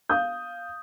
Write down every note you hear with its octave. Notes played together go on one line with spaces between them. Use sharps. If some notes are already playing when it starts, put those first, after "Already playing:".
F5 D#6 G6